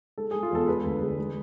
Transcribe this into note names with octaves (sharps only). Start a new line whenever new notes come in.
G#3 A4
G#4
G#3
F4
E2 A4
G#3 B4
D2
G#3
G#3